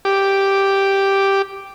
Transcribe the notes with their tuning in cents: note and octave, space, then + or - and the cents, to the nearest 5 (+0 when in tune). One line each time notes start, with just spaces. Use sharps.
G4 +0 D6 +0